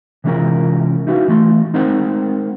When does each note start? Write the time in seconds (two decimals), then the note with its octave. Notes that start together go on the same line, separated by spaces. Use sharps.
0.24 C3 E3 G#3 C#4 F4 A#4
1.07 D#4 E4 F#4 B4 F5
1.28 E3 A3 B5 C6
1.74 G#3 C4 D#4 A#4 C5 F#5